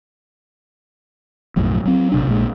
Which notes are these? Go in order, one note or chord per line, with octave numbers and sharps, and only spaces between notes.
B1 F#2 A2 F3
F#3 C4
A#1 C3 D4
A#1 A#2 G#3